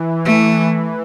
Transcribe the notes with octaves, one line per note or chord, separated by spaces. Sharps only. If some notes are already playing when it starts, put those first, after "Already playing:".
Already playing: E3
A3